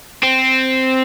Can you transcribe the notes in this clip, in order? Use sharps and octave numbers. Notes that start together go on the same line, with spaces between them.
C4